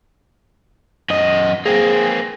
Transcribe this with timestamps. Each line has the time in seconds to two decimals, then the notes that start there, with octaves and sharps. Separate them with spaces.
1.10 F#2 D#5
1.66 A#3 C4 G#4